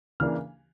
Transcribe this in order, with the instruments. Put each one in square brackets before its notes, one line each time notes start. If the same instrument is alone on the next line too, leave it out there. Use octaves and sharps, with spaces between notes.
[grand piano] C#3 E3 A#3 D4 F6